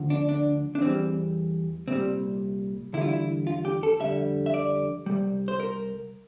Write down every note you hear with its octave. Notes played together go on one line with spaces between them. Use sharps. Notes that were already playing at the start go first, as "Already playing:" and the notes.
Already playing: D2 D3 F3
D4
D4
D4
E2 E3 G3 C4
C2 A#2 G3 C4
E2 D3 G3 E4
F4
E4
F4
G4
A4
F2 D3 G3 E5
E5
D5
C2 A#2 G3
C5
A#4